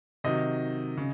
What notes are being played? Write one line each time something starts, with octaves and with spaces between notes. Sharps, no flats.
C3 D#3 F#3 D#5
C#3